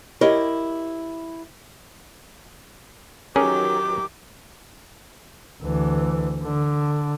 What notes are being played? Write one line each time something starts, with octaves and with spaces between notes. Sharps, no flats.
E4 G4 A#4 C#5 D#5
D#3 E3 F#3 C#4 G4 G#4 A#4 D6
D2 E3
D3